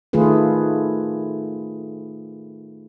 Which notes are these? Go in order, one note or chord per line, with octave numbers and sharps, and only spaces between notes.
D#3 A3 F4 G#4 B4